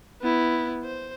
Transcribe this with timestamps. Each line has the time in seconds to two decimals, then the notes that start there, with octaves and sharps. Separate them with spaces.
0.21 B3 E4
0.84 C5